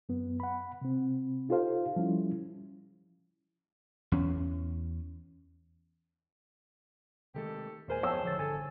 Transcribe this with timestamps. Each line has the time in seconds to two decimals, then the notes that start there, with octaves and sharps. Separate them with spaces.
0.09 F#2 B3
0.40 F#5 B5
0.81 C3 C4
1.49 D#4 F4 G4 A4 C5 F5
1.96 F3 G3 C#4 E4
4.12 E2 C#4
7.34 C3 D#3 G#3 A3 G4 A4
7.88 D#2 A#2 G#3 E4 A#4 C5 G#5
8.03 F#1 F3 B3 C#5 G5 A5 E6
8.23 A1 D3 D#3 F3 C#5 A6
8.38 G1 A4 G#5 A6